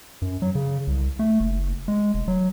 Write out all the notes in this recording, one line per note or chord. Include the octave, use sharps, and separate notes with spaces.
F#2
F#3
C#3
C2
A3
F#1
G#3
F1
F#3